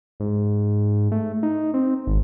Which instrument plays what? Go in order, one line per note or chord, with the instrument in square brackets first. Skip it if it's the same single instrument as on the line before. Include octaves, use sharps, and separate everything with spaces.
[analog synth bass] G#2
A3
D#4
C4
G#1